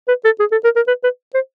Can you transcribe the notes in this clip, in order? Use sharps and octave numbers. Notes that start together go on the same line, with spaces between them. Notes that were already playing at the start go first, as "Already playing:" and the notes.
B4
A4
G#4
A4
A#4
A#4
B4
B4
C5